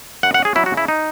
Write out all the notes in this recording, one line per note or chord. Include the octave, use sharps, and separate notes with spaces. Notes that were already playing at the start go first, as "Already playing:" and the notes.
F#2 F#5
F#5
C#4
G#4
F#3 E4
F#4
C#3
E4
D#4